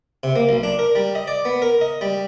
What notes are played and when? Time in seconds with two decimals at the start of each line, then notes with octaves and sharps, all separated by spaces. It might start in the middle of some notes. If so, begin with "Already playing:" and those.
0.23 C3
0.36 A#3
0.49 B1
0.63 D4
0.79 A#4
0.95 G3
1.15 D#5
1.28 D5
1.45 B3
1.62 A#4
1.81 D#5
2.01 G3